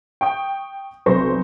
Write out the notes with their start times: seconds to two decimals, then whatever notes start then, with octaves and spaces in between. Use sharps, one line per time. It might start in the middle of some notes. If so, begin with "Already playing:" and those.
0.21 G5 C#6 D#6 G6
1.06 F1 B1 B4 C5 C#6 A#6